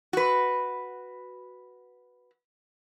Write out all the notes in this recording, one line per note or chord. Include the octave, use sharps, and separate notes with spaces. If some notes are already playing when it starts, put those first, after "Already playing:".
F#4 B4